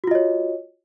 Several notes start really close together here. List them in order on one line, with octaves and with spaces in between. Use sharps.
F#4 F4 D#5 C#5